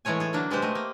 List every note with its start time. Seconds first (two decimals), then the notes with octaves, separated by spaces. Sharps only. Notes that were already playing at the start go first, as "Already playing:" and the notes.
0.05 A2 E3 G#3 A3 C#5 G#5
0.20 G#4 A4
0.33 D3 F#3 A#3 D4
0.51 B2 G#3 B3 G4 C5
0.62 A3 D#5
0.75 A#3